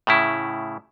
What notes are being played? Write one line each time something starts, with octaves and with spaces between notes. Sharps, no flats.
A2 C#3 E4